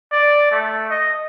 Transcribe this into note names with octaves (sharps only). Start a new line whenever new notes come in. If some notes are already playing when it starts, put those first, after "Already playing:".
D5
A3
D#5